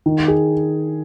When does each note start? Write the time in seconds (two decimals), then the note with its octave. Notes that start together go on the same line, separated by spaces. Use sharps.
0.06 D#3
0.28 G#4